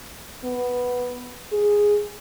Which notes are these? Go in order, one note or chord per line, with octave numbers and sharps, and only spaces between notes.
B3
G#4